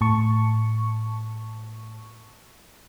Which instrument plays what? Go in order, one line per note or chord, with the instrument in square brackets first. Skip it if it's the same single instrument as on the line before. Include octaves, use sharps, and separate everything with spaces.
[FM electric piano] A2 A5 C#6